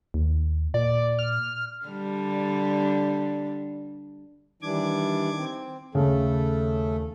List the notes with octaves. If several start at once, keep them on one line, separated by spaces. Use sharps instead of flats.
D#2
A#2 D5
F6
D3 G3 D4
D#3 E3 G3 D4 D6 G#6
C4
D#2 C#3 A3 A4